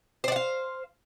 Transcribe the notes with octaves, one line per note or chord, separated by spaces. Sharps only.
C5 D5 F5 F#5